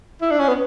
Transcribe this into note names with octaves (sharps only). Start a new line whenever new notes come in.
E4
D4
C#4
B3